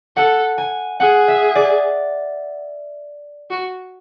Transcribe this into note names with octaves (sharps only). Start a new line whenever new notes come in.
A4 F#5
G#5
G#4 F#5
E5
D5
F#4